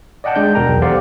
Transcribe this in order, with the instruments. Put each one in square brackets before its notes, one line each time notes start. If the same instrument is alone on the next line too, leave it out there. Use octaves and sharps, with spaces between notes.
[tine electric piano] D5 D#5 F#5 G5 A5
G#3 D4 G6
D#2 B2 A#4 G5 A#5
B1 E2
G4 A4 C5 D5 F5 F#5